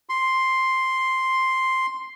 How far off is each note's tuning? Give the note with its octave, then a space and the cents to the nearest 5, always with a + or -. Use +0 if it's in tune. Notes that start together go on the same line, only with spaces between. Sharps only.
C6 +5